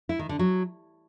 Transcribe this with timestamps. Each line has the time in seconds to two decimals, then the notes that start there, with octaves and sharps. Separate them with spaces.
0.09 E4
0.19 D#3
0.29 D3
0.39 F#3